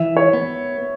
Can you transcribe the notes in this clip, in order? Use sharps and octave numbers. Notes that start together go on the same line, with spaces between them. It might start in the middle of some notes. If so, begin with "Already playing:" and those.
Already playing: E3 E5
C#5
B3